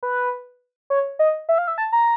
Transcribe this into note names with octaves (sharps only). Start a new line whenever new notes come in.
B4
C#5
D#5
E5
F5
E5
A5
A#5